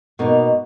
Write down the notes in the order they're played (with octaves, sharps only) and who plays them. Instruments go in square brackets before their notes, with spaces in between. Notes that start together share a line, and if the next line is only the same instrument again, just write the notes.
[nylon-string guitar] B2 A#3 D#4